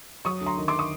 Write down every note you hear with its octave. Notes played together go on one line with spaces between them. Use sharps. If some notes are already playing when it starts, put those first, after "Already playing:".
F#3 C#6 D#6
D2
A#5 C6
D#3
C6 D6
C#6 D#6